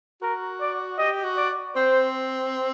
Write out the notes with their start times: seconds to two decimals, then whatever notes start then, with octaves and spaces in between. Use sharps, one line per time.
0.21 F#4 A#4
0.61 D5
0.98 G4 D#5
1.24 F#4
1.37 D5
1.75 C4 C5